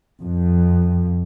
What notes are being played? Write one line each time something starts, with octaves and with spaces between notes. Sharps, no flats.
F2